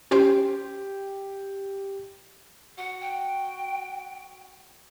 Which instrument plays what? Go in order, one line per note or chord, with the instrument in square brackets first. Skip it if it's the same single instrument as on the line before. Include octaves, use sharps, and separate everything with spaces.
[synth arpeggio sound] C#4 C5 G5 [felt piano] G4
[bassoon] F#4 [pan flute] F#5
[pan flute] G5